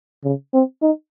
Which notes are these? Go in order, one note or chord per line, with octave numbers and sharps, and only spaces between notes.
C#3
C4
D#4